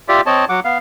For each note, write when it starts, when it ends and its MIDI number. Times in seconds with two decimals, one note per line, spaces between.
0.09 0.21 65
0.09 0.21 67
0.09 0.21 74
0.09 0.21 76
0.26 0.45 60
0.26 0.45 73
0.26 0.45 75
0.26 0.45 81
0.49 0.60 54
0.49 0.60 78
0.49 0.60 86
0.65 0.78 59
0.65 0.78 77